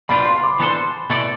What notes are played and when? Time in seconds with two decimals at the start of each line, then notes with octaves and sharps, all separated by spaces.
0.09 B2 G3 D4 F4 B5
0.26 C6
0.36 C6
0.43 D6
0.60 E3 B3 D4 A4 C5
1.10 B2 A3 E4 A4 D5